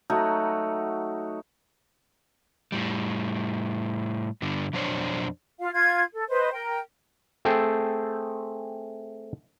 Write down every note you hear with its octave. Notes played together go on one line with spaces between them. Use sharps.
F#3 A3 D#4 F#4
A2 G3
G2 D3
F2 B2 F#3 D4 C5 C#5
F4 F5
F4 G#6
A4
B4 C5 D#5
A#4 G5
A3 C4 G#4 A4 G5